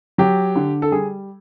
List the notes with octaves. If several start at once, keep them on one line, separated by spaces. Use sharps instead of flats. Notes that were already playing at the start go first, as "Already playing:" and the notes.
F#3 G4
D3
A4
G3 G#4